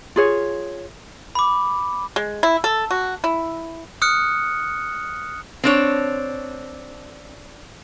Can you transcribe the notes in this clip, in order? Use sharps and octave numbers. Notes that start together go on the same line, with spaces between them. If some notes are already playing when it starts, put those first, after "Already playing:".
F4 G#4 C#5
B5 D6
G#3
E4
A4
F#4
E4
D#6 F6 F#6 C#7
C4 D4 C#5